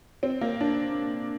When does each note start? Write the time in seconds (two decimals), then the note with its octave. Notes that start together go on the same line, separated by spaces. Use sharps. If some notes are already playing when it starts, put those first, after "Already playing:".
0.23 C4
0.41 A#3
0.61 D4